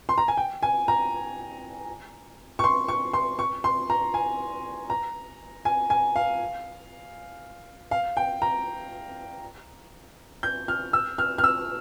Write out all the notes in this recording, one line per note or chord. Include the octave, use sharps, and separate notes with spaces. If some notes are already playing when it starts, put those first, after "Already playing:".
C6
A#5
G#5
G5
G#5
A#5
C#6
C6
C#6
C6
C#6
C6
A#5
G#5
A#5
G#5
G#5
F5
F5
G5
A#5
G6
F6
E6
F6
F6
E6